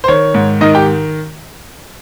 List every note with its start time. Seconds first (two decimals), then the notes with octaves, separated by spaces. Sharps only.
0.04 C5
0.08 D#3 C#5
0.34 G#2
0.61 D#3 D#4 D#5
0.75 G4 G5